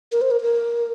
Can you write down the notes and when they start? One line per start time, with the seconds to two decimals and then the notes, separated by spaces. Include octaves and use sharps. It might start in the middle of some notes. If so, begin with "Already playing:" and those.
0.12 A#4
0.21 C5
0.31 A#4
0.41 A#4